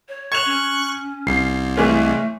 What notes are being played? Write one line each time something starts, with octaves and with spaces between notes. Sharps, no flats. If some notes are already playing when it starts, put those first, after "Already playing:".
C#5
C#6 F#6 G#6 E7 F7
C#4
C2 C7
E3 G#3 A3 C#4